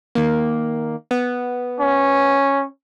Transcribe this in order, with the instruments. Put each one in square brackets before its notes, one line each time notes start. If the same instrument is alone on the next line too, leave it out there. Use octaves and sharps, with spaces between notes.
[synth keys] D#3 A#3
B3
[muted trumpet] C#4